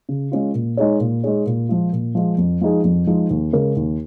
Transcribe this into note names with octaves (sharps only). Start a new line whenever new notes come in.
C#3
G#3 C#4 F4
A#2
G#3 D#4 G#4 C#5
A#2
G#3 D#4 G#4 C#5
A#2
F3 G#3 F4
A#2
F3 G#3 F4
F2
F3 G#3 D#4 G#4
F2
F3 G#3 D#4 G#4
D#2
C#3 G#3 C#4 A#4
D#2